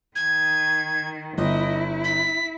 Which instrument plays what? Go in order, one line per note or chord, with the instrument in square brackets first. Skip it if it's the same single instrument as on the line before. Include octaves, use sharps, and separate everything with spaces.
[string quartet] D#3 [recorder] G#6
[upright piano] G1 [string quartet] E4 [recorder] D#5
[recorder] B6